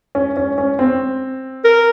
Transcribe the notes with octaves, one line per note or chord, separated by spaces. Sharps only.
C#4
C#4
C#4
C4
A#4